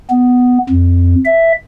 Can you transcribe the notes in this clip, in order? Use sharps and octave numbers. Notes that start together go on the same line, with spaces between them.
B3
F2
E5